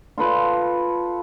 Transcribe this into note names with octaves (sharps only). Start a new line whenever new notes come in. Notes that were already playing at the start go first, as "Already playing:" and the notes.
F4 A4 B4